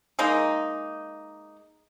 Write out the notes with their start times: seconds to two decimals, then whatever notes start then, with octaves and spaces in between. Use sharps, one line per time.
0.19 G#3 A#3 D#4